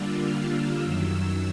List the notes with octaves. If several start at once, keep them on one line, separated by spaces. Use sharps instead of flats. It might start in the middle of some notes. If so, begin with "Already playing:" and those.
Already playing: D3 G3 A#3 D4 F4 E6
F6
F#2 D#3 F#3 E6